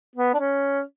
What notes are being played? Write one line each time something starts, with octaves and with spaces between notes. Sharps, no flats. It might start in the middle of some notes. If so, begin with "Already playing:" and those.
B3
D4
C#4